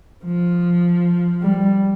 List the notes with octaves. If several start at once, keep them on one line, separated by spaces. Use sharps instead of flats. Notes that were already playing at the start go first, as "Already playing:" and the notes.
F3
G3